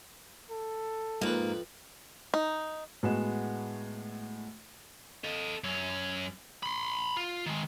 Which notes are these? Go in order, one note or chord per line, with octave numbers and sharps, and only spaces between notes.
A4
F2 G#2 A#3 B4
D#4
A2 G#3 B3 F#4 E7
A4 D#5
F#2 C#4
B5 C6
F4
D#3 G#3